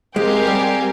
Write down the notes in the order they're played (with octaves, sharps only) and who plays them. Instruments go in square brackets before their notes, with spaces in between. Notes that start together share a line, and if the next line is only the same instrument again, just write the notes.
[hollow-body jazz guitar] G#3 [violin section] C4 G4 A#4 F5 G#5
[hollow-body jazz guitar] G3